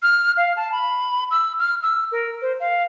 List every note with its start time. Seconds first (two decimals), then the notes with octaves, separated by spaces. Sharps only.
0.03 F6
0.37 F5
0.57 A5
0.72 B5
1.31 E6
1.60 F6
1.83 E6
2.12 A#4
2.42 C5
2.60 F5